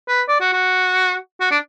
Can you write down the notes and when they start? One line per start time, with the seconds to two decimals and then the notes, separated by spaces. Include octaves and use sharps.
0.08 B4
0.28 D5
0.41 F#4
0.53 F#4
1.40 F#4
1.51 D4